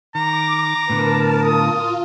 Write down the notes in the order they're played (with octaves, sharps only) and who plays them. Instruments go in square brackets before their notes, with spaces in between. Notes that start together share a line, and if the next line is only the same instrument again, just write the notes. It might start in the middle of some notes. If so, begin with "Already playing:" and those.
[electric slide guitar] D#3 [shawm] A#5 [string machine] D6
[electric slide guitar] A2 D3 B3 [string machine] A#4 A5 [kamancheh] B4
[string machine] F4 [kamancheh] D#6